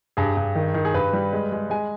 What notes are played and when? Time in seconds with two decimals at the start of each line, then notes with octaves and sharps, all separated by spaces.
0.17 G2 G#4
0.37 G2
0.55 D#3
0.74 D#3
0.85 G#4
0.94 G2 B4
1.13 G3
1.33 G#3
1.52 G#3
1.70 G#3 G#5